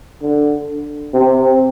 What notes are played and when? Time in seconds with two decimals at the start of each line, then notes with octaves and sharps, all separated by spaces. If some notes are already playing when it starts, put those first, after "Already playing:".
0.22 D3
1.14 C3